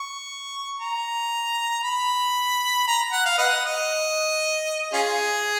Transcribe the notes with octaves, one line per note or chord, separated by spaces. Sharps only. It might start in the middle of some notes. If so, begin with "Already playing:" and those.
Already playing: C#6
A#5
B5
A#5
F#5
F5
B4 D#5 F#5
D#5
C#4 F4 G#4